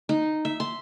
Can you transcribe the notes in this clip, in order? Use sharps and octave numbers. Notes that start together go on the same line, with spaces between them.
D#4
E5
C6